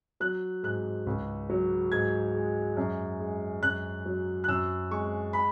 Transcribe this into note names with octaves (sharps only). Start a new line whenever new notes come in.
F#3 F#6
G#2 F#6
C#2
F#3
G#2 G#6
G#3
F#2
G#3
F#2 F#6
F#3
F#6
F#2 E6
G#3 C#6
B5